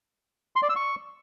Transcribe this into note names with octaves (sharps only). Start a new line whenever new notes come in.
C6
D5
E6
C#6